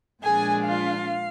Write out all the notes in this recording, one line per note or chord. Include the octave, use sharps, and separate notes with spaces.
A#2 F3 G#3 D4 G#4 G#5
F4 F5